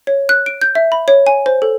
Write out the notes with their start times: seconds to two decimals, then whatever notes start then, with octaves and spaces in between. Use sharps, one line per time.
0.07 C#5
0.29 F#6
0.46 D7
0.61 G6
0.75 E5
0.92 B5
1.08 C#5
1.27 G#5
1.46 C5
1.62 A4